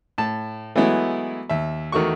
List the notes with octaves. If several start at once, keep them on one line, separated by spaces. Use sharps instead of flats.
A2 A5
E3 F#3 G#3 A3 B3 E4
D#2 E5
E2 D#3 A3 F#4 C#6